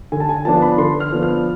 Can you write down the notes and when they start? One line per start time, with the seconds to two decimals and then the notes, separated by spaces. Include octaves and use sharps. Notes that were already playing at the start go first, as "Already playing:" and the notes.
0.12 D3 G#5
0.20 A5
0.29 G#5
0.45 F3 B3 D4 A5
0.57 A5
0.62 B5
0.78 D3 C6
1.00 F6
1.12 F3 B3 D4
1.23 F6